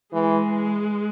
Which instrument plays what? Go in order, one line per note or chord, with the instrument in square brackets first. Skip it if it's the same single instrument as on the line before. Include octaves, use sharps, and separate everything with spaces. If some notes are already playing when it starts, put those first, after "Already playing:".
[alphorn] E3 [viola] G#3